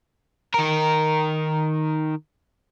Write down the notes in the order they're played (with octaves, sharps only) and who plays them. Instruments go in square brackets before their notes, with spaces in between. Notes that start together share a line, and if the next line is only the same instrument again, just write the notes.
[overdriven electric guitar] D#3 A#4